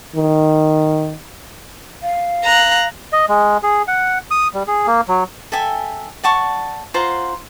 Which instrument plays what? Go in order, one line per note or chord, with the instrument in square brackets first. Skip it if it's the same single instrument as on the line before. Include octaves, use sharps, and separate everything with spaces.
[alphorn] D#3
[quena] F5
[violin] A#5 F#6
[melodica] D#5
G#3
G#4
F#5
D#6
G3
G#4
A#3
F#3
[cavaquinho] A4 E5 G5 G#5
D5 F#5 A5 C#6
F4 C5 F#5 A#5